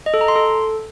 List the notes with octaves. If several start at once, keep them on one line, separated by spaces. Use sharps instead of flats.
D#5
A4
A#5
C6
A4